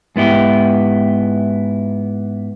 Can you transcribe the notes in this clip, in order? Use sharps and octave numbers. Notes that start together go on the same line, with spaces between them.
G#2 B3 E4 G4